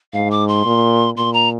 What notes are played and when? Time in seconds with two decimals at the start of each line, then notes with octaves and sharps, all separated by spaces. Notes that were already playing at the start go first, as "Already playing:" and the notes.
0.13 G#2 F5
0.31 D6
0.48 C6
0.65 A#2
1.17 A#2 C6
1.33 A#5